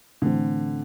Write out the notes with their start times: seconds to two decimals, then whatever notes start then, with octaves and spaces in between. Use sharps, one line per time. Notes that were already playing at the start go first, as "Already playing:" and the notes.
0.22 A2 D3 E3 A3 C4